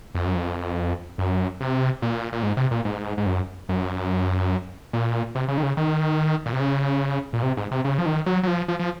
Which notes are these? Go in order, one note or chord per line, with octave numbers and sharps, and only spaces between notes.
F2
F#2
F2
F#2
C3
A#2
A#2
G#2
C3
A#2
G#2
G#2
F#2
F#2
A#2
C3
C#3
D#3
C#3
D#3
A#2
C3
C#3
A#2
C3
G#2
C3
C#3
F3
D#3
F#3
F#3
F3
F3
F3